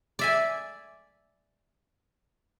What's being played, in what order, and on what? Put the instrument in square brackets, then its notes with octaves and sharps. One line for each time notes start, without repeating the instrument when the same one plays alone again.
[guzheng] D5 E5 G#5